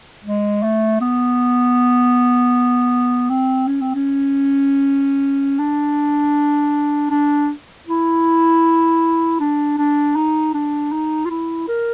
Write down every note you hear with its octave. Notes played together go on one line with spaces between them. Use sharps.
G#3
A3
B3
C4
C#4
C4
C#4
D4
D4
E4
D4
D4
D#4
D4
D#4
F4
E4
A#4